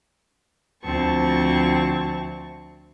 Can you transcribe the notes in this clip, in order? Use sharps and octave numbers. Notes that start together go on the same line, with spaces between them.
D2 F3 C4 A5 C#6